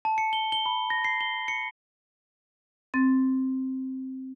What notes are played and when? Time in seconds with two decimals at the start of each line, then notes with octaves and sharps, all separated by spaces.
0.05 A5
0.18 C#7
0.33 G7
0.52 G7
0.66 B5
0.90 A#6
1.05 C7
1.21 G7
1.48 C#7
2.94 C4 A6